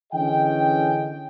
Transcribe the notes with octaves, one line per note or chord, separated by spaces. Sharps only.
D3 E3 C#4 G#4 D#5 G5